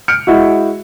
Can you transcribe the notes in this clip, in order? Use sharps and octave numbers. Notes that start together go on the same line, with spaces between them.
F6 G6 C#7 D7
G#3 E4 F#4